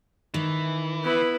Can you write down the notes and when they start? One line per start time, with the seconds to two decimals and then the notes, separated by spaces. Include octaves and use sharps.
0.34 D#3 E3
1.04 B3 E4 B4